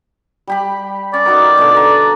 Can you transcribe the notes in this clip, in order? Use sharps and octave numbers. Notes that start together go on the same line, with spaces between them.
G3 G4 B5
C#4 D5
D#4 F#4 A#4
B2 D3
A5 A#5